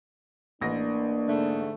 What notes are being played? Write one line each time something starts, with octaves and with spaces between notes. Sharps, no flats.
A1 A#3 D4 A#6
G#2 D3 A3